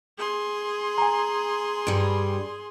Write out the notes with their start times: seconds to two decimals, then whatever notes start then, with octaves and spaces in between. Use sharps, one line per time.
0.18 G#4 C6
0.98 G#5 A#5
1.87 G2 G3